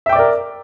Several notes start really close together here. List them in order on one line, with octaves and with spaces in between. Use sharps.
E5 G5 D6 D5 A#4